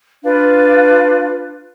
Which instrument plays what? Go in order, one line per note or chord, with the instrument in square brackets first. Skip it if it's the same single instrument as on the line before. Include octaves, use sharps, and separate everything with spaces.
[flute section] D4 F4 B4 F5